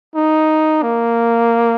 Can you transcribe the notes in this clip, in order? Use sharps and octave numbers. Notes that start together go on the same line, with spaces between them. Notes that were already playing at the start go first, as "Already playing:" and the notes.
D#4
A#3